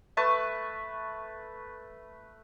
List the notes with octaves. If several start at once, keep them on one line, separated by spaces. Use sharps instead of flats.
A3 B4 A5 C#6